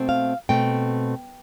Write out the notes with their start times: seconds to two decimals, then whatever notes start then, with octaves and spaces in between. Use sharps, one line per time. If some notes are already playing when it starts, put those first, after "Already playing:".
Already playing: B2 A3 C4
0.09 F5
0.49 B2 A3 C4 G5